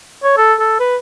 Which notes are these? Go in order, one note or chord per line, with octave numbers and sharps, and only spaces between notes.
C#5
A4
A4
B4